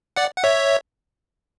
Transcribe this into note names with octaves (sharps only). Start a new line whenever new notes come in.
D5 F#5
F#5
C#5 E5